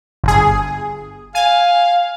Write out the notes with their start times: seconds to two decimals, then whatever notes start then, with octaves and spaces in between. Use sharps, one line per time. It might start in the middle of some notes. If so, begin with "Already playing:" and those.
0.24 G1 G#4
1.35 F5 G#5